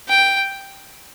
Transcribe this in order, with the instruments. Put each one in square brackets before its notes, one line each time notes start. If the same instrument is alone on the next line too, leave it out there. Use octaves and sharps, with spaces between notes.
[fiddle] G5